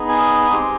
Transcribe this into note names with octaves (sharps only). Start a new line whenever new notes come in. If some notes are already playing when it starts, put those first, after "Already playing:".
Already playing: B3 D#4 G#4
G#5
G#3 C4 D#4 G4